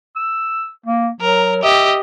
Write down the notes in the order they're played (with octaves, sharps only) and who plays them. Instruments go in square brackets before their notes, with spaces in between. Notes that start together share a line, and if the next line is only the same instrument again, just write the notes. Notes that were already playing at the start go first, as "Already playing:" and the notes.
[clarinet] E6
A#3
[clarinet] F#3 [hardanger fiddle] A#4
[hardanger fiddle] G4 D#5 [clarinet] E5